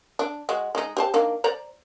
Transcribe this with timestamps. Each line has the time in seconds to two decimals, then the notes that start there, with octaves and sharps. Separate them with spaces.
0.19 D4
0.49 G#3 F#4
0.75 G#3 D#4
0.97 G4 C5 A5
1.14 D#3 A#3 D4
1.44 C5 D5 A#5